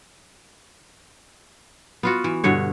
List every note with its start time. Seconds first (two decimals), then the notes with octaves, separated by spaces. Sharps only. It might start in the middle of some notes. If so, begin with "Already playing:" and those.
2.03 B3 F4 F#4
2.24 E3
2.44 G2 B2 D3 C#5